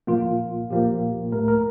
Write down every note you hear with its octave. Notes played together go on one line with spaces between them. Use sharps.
A#2 F3 A#3 F4
A#2 F3 A#3 G4
A2 A3 A#4
A#4